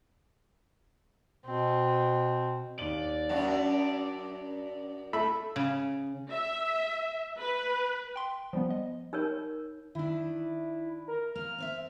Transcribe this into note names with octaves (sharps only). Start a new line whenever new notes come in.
B2 C4
D#2 D5 F#7
F#2 D4 F#5
A3 E5 B5
C#3
E5
B4
G5 C6
F3 G3 B3
D#5
D#4 A#4 C#5
D#3 D4 E4
A#4
A#3 F6
C4 C#5 E5